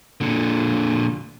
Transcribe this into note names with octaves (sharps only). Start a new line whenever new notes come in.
A#2 D3